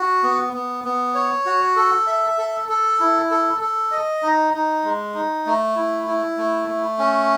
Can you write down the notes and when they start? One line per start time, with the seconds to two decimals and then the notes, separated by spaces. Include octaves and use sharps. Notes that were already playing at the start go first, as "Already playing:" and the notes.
Already playing: F#4
0.23 B3
0.53 B3
0.85 B3
1.15 C#5
1.46 F#4
1.76 A4
2.07 E5
2.38 A4
2.69 A4
3.00 E4
3.31 A4
3.61 A4
3.91 D#5
4.23 D#4
4.54 D#4
4.84 G#3
5.14 D#4
5.46 A3
5.76 E4
6.07 E4
6.37 A3
6.68 A3
6.99 C#4